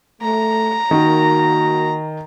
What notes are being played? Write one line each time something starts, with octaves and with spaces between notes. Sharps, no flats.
A3 A#5
D#3 A#3 F#4